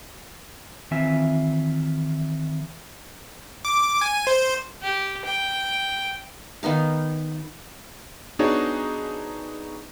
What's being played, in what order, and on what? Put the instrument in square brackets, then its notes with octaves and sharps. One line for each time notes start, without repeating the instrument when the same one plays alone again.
[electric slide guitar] D#3 E3 C4 F4 E5 G#5
[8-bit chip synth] D6
G#5
C5
[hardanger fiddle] G4
G5
[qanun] D#3 B3 D#4 F5
[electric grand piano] B3 D4 D#4 F#4 G#4 C#5